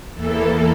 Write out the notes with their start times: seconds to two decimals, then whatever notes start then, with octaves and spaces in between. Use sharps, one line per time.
0.14 E2 E3 A#3 A4